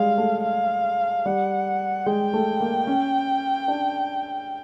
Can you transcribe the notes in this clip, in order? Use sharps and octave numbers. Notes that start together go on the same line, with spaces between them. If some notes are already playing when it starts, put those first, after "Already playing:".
Already playing: G3 G#3 F5
A3
F5
G3 F#5
G#3 G5
A3
A#3
C#4
D4